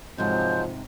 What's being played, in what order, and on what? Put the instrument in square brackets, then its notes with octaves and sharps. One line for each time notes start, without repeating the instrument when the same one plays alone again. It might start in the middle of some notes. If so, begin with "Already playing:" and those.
[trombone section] F2 F3 [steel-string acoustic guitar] G#2 C3 [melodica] F#3 G#3 [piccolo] G6